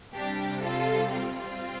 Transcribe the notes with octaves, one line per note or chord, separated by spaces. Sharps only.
C3 G3 D4 G4
F4 A4
C4 F4